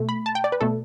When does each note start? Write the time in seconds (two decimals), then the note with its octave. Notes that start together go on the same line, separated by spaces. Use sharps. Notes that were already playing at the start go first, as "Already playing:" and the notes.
Already playing: B2 A3
0.09 B5
0.26 A5
0.35 G5
0.44 D5
0.52 B4
0.61 B2 A3 A4